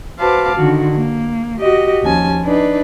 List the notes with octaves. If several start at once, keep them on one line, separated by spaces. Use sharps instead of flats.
F#4 B4 C5 F5 A5 D6
D3 D#3 F#4
A#3
F#4 G4 D#5
D#2 F3 C#4 G#5 A5
D4 D#4 B4 D5